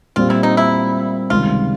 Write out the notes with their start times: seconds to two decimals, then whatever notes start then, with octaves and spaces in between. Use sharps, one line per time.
0.16 A#2 G3 C4 F4
0.30 E4
0.43 D#4
0.57 E4
1.30 C#2 C3 D#3 G3 F4